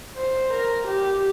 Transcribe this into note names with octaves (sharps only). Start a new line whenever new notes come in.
C5
A#4
G4